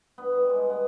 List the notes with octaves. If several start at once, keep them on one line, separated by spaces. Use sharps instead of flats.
G2 B3
D#3 G3
G2 G3 G#3
D#3 G3 B3